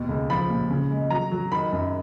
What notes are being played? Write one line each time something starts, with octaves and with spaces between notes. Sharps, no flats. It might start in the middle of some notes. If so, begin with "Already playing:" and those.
Already playing: D#2 B2
C#2
F3 B5
A#2
C#3
G#3
F#3 A#5
F#3
D#3 B5
F#2